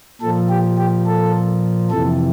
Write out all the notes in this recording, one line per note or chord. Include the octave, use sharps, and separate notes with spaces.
A#2 F3 A4
G4
G4
A4
F2 C3 E3 A4